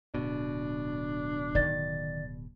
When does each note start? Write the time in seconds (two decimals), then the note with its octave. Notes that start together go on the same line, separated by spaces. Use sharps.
0.15 D1 B2 D4
1.55 D#3 D5 A6